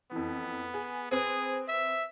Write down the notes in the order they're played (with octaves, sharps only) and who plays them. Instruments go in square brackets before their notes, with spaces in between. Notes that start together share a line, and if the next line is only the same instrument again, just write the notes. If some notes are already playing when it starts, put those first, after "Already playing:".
[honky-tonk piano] F2 E3 [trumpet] B3
[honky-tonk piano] G#4
[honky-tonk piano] C4 B4 D#6 [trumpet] G#4
[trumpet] E5